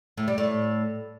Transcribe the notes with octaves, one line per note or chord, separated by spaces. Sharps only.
A2
G3
A2